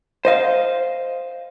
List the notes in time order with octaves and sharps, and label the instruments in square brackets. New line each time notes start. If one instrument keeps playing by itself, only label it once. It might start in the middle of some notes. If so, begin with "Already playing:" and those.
[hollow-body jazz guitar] C5 D#5 F5